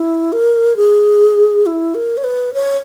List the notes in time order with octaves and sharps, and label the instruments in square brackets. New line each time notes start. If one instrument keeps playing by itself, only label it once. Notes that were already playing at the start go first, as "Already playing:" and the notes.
Already playing: [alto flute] E4
A#4
G#4
E4
A#4
C#5
B4
C#5